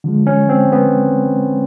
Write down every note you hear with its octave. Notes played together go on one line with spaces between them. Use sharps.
D3 F3 G#3
C#4
C4
B3